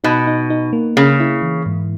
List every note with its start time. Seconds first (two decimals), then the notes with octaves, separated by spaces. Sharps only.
0.04 B2 D#4
0.27 D#4
0.50 D#4
0.73 A#3
0.97 C#3 A#3
1.20 E4
1.42 E3
1.66 G#2